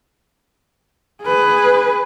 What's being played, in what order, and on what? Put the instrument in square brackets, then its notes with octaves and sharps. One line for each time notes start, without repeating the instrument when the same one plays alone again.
[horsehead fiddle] G#4 B4